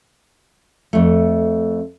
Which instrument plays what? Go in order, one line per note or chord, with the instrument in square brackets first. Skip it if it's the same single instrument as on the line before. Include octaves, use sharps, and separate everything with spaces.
[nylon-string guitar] F2 A3